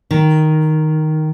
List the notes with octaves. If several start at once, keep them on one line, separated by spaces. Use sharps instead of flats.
D#3